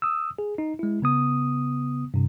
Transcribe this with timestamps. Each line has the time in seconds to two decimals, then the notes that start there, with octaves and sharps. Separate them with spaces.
0.02 D#6 E6
0.39 G#4
0.58 D#4
0.79 G#3 E4
1.02 C#3 B3 D#6
2.14 G2 C3